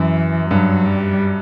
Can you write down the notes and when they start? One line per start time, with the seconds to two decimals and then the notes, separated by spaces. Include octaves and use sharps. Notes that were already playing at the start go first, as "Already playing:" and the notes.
Already playing: F#2 E3
0.50 G2 F#3
0.86 G3